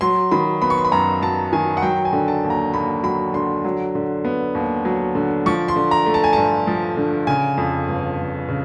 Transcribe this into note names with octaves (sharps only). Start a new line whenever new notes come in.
F#3 C6
D#3 B5
B3 B5
C#6
C6
B5
F#2 A#5
F#3 A5
D#3 G#5
F#5
F#3 G5
G#5
D3
A5
D#2
A#5
D#2 B5
F#3 B5
D3 C6
F#3
D3
B3
D#2
F#3
D3
F3 C#6
C6
D3
A#5
A3
A5
G#5
G2 A5
F3
D3
C#3 G#5
F2
G1
G1
C#3